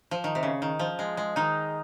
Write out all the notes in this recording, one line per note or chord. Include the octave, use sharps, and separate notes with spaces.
F3
D#3
C3
C#3
D#3
F3
G#3
G#3
D#3 D#4